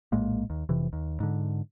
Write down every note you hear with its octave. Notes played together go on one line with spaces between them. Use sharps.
A#1 A2 G#3 A#3
D#2
F1 C3 E3
D#2
G#2 D3